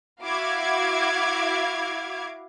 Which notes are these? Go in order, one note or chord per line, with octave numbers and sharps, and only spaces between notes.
E4 F#4 F5 D6 G#6